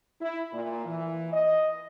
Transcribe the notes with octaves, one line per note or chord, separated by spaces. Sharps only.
E4
A#2
E3
D#5